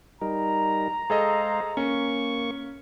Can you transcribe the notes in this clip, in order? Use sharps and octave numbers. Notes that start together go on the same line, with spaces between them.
G3 D#4 A#4 A#5
G#3 G#4 A4 C5 D#5 F5
A#3 C#4 C#6